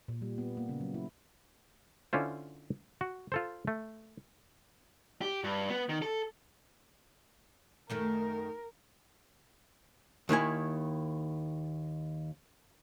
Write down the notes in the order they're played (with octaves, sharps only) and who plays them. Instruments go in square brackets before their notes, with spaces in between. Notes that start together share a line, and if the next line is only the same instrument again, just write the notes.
[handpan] A#2
G3
B3
A#3
C#3
F#3
E4
[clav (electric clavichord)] D3 C#4 E4 F4 C5
F#4
F4 A4 C5
A3
[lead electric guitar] G4
G2
B3
D#3
A4
[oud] F#2 D#3 A3 [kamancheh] A#4
[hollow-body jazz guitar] D#2 D#3 E4 G#5